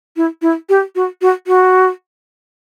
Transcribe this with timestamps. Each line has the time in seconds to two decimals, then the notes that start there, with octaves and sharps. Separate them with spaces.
0.17 E4
0.42 E4
0.69 G4
0.95 F#4
1.22 F#4
1.47 F#4